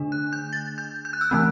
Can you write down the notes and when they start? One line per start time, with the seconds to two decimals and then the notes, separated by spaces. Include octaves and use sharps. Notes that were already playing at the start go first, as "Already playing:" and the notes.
Already playing: D3 A3 D4
0.12 F#6
0.33 G6
0.53 A6
0.78 G6
1.05 G6
1.13 F#6
1.21 E6
1.30 E3 A3 C4 F#6